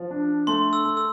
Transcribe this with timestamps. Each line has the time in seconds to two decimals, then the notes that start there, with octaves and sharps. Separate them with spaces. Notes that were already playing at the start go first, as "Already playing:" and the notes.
Already playing: F3
0.11 D4
0.47 A3 C6
0.73 E6
0.84 A4
0.97 E6